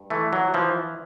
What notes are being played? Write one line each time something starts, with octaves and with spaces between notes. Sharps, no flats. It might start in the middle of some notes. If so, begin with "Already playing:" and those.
Already playing: G2
E3 A3
F#3
E3 F3